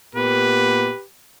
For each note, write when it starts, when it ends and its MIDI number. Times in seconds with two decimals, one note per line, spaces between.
0.15 0.90 46
0.15 0.90 59
0.15 1.05 67
0.15 1.03 71